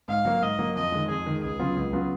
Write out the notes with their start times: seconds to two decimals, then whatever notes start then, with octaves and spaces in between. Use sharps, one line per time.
0.08 G#2 F5
0.25 F#3 A#3
0.42 G#2 D#5
0.59 F#3 A#3
0.75 F2 D#5
0.92 D#3 G#3
1.09 F2 G#4
1.26 D#3 G#3
1.43 C#2 G#4
1.60 C#3 F#3 B3 F4
1.76 C#2
1.93 C#3 F#3 B3 F4